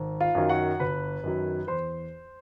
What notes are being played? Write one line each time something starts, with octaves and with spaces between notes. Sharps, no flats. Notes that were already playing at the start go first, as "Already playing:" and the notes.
Already playing: G#1
F4 F5
F#2 D#3 F#3
F#4 F#5
G1 B4 B5
F#2 D#3 F#3
E2 C5 C6